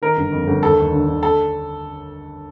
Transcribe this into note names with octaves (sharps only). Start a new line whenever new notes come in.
D#3 A#4
G1
F2
G1
D#2 A4
D#2
D3
D3
A4